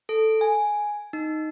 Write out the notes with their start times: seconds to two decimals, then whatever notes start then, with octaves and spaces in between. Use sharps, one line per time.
0.09 A4
0.41 G#5
1.13 D#4